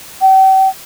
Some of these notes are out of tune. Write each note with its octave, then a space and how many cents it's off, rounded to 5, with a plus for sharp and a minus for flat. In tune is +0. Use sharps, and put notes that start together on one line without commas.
G5 -40